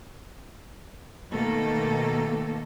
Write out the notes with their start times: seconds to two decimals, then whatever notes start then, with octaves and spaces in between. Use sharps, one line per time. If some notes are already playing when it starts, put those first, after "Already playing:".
1.31 B2 D#3 A3 A#3 A4